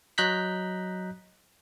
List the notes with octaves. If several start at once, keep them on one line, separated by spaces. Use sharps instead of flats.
F#3 D#5 A#5 F#6 G6 B6